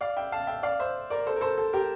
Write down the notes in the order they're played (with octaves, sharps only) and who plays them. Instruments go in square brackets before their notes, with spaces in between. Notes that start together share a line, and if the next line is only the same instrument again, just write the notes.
[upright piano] D5 F5
E5 G5
F5 A5
E5 G5
D5 F5
C5 E5
A#4 D5
A4 C5
A#4
A4 C5
A4
G4 A#4